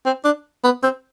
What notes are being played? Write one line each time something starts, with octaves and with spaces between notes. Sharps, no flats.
C4
D4
B3
C4